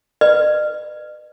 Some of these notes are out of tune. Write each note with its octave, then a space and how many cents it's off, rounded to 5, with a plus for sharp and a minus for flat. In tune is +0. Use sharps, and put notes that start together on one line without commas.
B4 +0 D#5 -45